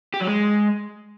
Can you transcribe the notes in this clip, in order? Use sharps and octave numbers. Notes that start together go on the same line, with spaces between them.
G4
F#3
G#3